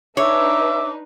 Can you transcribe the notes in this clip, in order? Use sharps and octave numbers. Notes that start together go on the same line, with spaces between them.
D4 D#4 B4 C#5 E5 D6